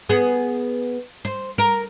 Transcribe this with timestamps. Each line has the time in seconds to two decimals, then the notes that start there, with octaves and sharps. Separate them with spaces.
0.09 B3 G#4
1.25 C5
1.58 A#4